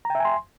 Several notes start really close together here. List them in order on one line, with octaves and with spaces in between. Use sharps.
A#5 G5 E5 G#5 C6